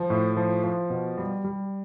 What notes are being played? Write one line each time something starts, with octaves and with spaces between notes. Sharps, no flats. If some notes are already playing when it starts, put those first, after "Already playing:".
Already playing: F3
A2
F3
F3
B2
G3
G3